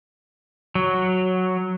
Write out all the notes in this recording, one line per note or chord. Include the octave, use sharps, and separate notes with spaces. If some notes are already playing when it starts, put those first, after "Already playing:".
F#3